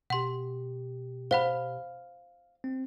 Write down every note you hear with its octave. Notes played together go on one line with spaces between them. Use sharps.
B2 G4 F#5 C6
C5 F5 F#5 B5
C4